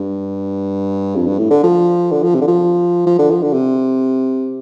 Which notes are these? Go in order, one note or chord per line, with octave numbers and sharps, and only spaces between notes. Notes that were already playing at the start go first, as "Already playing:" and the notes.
Already playing: G2
F2
G2
A2
D3
F3
D3
F3
C3
D3
F3
F3
D3
F3
D3
C3